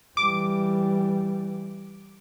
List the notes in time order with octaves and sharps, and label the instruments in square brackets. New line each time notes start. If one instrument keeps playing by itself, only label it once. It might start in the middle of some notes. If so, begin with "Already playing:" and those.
[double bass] E3 G3 [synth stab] D6